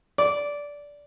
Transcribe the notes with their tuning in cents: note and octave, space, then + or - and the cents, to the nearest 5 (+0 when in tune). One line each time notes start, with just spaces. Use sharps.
D5 -15